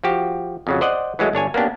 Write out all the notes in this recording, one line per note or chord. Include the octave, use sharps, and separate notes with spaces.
F3 F#4 G4
F2 C#3 F#3
C5 D5 D#5 F#5
E3 F#3 G#3 A3
G1 D4 C#5 G#5
A#3 B3 C#4 D4 G4